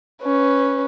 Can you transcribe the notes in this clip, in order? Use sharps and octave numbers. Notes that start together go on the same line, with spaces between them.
C#4 B4